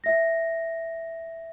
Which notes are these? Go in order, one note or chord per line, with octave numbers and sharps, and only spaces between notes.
E5 A#6